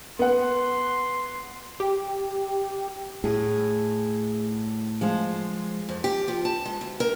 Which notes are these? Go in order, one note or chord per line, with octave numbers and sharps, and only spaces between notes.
B3 F#5 C6
G4
A2 G#4
F3 G#3 C5
F2
G4
F3
A5
G#3
D2
A#4